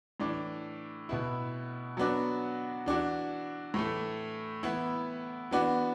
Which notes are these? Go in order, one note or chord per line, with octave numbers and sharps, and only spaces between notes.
A2 E3 D4
B2 B3 E4
F#3 B3 D4 F#4
E3 D4 F#4
A2 E3 A3
E3 B3 E4
E3 B3 D4 F#4